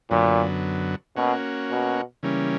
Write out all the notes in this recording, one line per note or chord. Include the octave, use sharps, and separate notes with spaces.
F#2 A#2 D3 F#3 B3
B2 A#3 C#4 F#4
B2
C#3 E3 G3 A#3 C#4